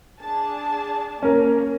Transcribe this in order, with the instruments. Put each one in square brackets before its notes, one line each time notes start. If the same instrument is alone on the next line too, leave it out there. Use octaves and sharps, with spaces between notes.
[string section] D4 G#4 A5
[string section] A#3 [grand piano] C#4 A#4